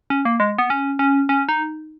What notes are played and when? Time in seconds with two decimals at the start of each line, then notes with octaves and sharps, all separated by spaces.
0.10 C#4
0.25 A#3
0.40 G#3
0.58 B3
0.70 C#4
0.99 C#4
1.29 C#4
1.49 D#4